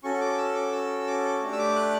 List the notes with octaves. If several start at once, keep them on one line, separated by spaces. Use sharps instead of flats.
C#4 F#4 A4 C#6
C#6
D6
E6
D6
E6
D6
A3 D4 G4
E6
D6
F#6